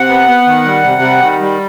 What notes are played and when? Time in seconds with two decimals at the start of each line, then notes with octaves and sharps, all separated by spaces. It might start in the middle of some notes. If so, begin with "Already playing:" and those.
Already playing: C3 F#5
0.09 B3
0.28 B3
0.46 D#3
0.65 G3
0.83 C3
1.02 G3
1.21 D#3
1.40 G3